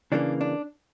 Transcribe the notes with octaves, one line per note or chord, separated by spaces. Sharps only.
C#3 E3 G3 A#3 D4
D4